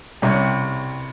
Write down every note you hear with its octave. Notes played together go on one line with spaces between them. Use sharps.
C2 C3 G3 C#4